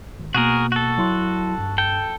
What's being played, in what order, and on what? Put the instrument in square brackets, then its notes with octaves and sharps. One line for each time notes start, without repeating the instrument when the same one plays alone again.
[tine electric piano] G#1
[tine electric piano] B2 A#3 [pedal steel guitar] F#4 G#4 A#4
[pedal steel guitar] F#4 A4
[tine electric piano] F#3 E4 C6
G2
[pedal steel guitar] A4 G5